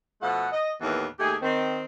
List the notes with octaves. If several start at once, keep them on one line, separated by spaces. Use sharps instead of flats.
B2 F3 A3 A4 F#5
D#5
D#2 A2 E3 A#3 B3 B4
D#2 A3 G4 G#4
D#3 C4